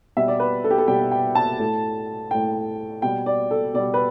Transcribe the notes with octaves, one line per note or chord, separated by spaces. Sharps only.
B2 G3 E5
D5
B4
A4
G4
A4
B2 G3 G5
G5
A5
A2 A3
A2 A3 G5
B2 G3 G5
D5
A4
B2 G3 D5
B4